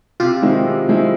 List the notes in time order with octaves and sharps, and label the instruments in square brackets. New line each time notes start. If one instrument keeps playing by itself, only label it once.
[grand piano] C3 [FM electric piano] F4 G4
[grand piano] D#3 G#3 C4 E4
C3
D#3 G#3 C4 E4